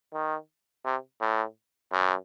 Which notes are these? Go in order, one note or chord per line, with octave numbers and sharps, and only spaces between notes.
D#3
C3
A2
F#2